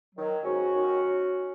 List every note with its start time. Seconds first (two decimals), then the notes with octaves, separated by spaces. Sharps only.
0.14 D#3 F#3
0.44 G#2 C#4 F#4
0.74 D#3 F#3